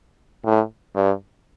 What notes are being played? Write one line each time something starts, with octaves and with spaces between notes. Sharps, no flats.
A2
G2